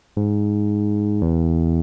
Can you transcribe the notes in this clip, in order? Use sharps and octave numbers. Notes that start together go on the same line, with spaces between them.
G#2
E2